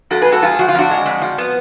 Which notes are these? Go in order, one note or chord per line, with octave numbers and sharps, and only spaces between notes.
F2 F#4 A4
G#4 B4
G#3
F#4 A4
F2 F4 G#4
F3 F#4
F4
F2 D4 F#4
G#3
F2
F3
B3